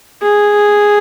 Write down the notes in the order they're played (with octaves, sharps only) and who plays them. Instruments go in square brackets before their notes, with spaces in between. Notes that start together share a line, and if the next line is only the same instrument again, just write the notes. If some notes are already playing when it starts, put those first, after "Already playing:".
[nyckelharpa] G#4